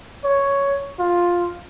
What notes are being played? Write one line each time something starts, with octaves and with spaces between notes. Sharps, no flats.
C#5
F4